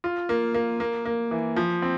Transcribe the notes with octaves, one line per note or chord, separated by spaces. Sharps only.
F4
A#3
A#3
A#3
A#3
E3
F3
C4